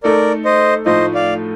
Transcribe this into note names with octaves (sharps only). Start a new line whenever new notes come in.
A3 D#4 A4 A#4 D5
C5 D#5
A2 F3 A3 D#4 C5 D#5
D5 F5